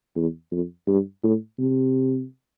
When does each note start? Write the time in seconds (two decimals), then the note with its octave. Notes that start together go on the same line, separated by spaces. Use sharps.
0.15 E2
0.51 F2
0.87 G2
1.23 A2
1.59 C3